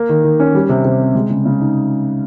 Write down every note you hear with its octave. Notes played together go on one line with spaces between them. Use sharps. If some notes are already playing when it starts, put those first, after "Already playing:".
Already playing: A#3
D#3
D#3
C#4
G3
C3
C3
C4
G#3
C#3
C#3
D#4